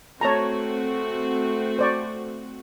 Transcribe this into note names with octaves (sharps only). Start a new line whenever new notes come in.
A3 C4 F#4 C#5 A5 A#5
C5 D5 C#6